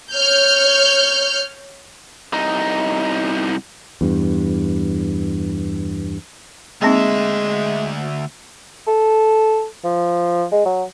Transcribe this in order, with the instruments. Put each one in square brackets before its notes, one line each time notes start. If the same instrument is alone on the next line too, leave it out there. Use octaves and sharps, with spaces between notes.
[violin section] C#5 F6 G6
[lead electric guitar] C2 D#4
[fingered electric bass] E2 G2
[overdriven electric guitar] D2 E5 [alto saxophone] G#3 [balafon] A#3 C4 D#4
[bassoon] A4
F3
G#3
F#3